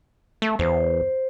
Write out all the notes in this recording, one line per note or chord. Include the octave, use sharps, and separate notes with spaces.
A3
E2 C5